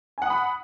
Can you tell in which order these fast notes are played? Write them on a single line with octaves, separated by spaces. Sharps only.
G#5 F#5 D#6 B5